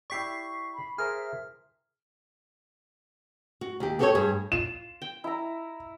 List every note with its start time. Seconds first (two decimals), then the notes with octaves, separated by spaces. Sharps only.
0.10 E4 G4 D5 C#6 B6 C7
0.74 B5
0.98 G#4 A#4 C5 E5 F6
3.61 F#4
3.80 D#2 G4
3.99 B3 F#4 G4 A4 B4 C#5
4.15 G2 G#4
4.52 F4 E7
5.02 G5
5.24 E4 A#5